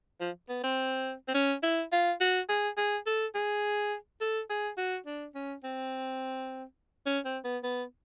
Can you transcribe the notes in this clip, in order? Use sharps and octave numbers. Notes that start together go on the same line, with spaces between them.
F3
B3
C4
C4
C#4
E4
F4
F#4
G#4
G#4
A4
G#4
A4
G#4
F#4
D4
C#4
C4
C#4
C4
B3
B3